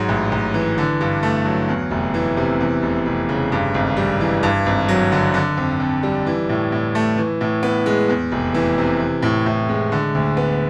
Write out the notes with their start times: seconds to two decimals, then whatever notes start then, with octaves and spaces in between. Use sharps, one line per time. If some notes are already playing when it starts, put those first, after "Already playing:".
Already playing: G#2 F#3
0.08 A1
0.32 A1
0.54 E3
0.78 D3
1.01 G2
1.23 A3
1.45 F#3
1.69 E2
1.91 F1
2.14 E3
2.37 C3
2.60 E2
2.83 F1
3.06 F1
3.29 C#3
3.52 G2
3.74 G#1
3.97 G3
4.20 E3
4.43 G2
4.66 G#1
4.88 F#3
5.12 D3
5.34 D3
5.57 F2
5.80 F2
6.03 G3
6.26 E3
6.49 A2
6.72 A2
6.95 A3
7.18 E3
7.41 A2
7.63 B3
7.86 G#3
8.09 E2
8.32 F1
8.54 E3
8.78 C3
9.00 E3
9.22 A2
9.46 A2
9.69 G#3
9.92 D3
10.15 D2
10.37 B3